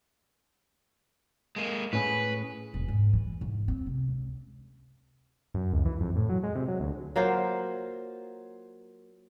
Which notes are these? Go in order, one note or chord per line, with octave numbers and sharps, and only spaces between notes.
G#3 A#3
A2 C#4 G#4 B4
E1
G#2
E3
G#2
C4
C3
C#2
F#2
C#2
E3
F2
A2
F#3
G#3
C3
F#3
D2
F#3 A#3 F4 C5